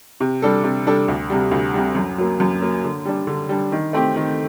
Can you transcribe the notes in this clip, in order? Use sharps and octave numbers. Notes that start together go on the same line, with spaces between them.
C3
G3 D4 A4
C3
G3 D4 A4
D2
C3 G3
D2
C3 G3
F#2
F#3 A#3
F#2
F#3 A#3
D3
G3 D4
D3
G3 D4
D#3
A3 C4 G4
D#3